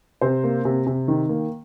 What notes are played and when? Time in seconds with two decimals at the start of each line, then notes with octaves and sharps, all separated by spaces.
0.21 C3 C5
0.44 A#3
0.65 C3
0.87 C3
1.08 D#3
1.29 A#3